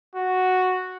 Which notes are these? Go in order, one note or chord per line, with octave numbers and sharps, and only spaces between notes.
F#4